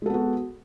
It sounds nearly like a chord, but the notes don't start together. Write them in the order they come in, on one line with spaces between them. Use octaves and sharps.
G#3 A4 B3 F#4